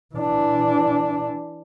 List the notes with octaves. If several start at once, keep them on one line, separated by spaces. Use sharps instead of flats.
E3 D4